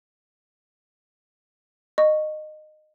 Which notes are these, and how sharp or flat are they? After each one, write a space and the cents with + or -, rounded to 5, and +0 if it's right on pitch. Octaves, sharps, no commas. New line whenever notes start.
D#5 -20 C#6 +0